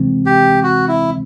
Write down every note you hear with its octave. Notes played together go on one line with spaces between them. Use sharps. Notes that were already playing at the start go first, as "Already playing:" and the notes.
Already playing: C3 E3 G#3 C4
G4
F#4
E4